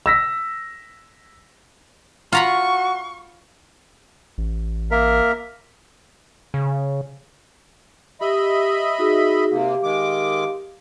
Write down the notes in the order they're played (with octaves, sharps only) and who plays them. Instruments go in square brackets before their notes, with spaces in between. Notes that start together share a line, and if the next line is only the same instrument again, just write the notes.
[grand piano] E6 A#6 B6
[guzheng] F4 A#5 B5 [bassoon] F#4 [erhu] C#6
[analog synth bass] A1
[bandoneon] A#3 A#4 E5
[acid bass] C#3
[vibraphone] G4 [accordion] D#5 E5 B5
[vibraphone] D#4 F#4 G#4
[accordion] C3 A#3 [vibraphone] G4 F5
[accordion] D#3 G#3 D6